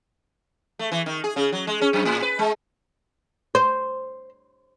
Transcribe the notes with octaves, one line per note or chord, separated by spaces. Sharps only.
A3
E3
D#3
G#4
C#3
F#3
G#3
C#4
F#2
A2
B4
G#3
C5